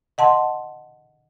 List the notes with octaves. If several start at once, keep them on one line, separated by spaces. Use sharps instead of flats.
D#5 F#5 A5 C6